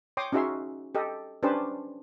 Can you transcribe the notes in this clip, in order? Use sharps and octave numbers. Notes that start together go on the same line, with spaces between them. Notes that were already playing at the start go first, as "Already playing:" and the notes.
C#5 G5 C6 D6 D#6
C#4 D#4 F#4 G#4 E5 C6
G4 A4 D#5
C#4 D4 G4 B4 C5 A5